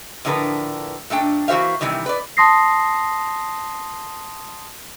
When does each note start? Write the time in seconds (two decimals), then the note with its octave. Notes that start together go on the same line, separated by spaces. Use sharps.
0.25 A2 D3 F3 A#4 B4
1.10 A#2 A3 D4 G5
1.48 E3 A#3 F#4 C5 E5 F5
1.81 C3 D#3 E3 G3
2.06 B4 D5
2.37 A5 C6 D#6 A#6 C7